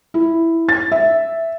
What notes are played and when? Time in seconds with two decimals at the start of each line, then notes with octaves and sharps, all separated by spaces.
0.14 E4
0.69 A6
0.92 E5